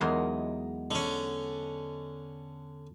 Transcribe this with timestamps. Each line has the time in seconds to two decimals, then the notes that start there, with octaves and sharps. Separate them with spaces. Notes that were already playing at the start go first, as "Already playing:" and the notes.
0.01 E2 F#3 G#3 D#4 A#4 C6
0.91 D3 C#4